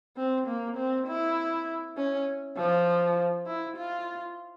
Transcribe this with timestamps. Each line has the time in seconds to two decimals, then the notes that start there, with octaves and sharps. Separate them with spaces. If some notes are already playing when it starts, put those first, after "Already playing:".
0.17 C4
0.47 A#3
0.77 C4
1.07 E4
1.97 C#4
2.57 F3
3.47 E4
3.77 F4